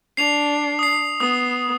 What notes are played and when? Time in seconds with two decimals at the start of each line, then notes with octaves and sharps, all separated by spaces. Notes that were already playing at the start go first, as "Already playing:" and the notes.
0.17 D4 C7 F7
0.79 D#6 C7
1.20 B3 D#6